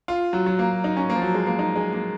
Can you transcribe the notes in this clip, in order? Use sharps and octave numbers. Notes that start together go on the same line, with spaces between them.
F4
F#3
F#3
A#3
D#4
C#4
A#3
F3
F#3
G#3
A#3
D#4
G#3
A#3